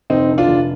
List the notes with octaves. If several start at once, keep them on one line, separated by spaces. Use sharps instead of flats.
F1 C4 D#4
D3
D4 F4
F1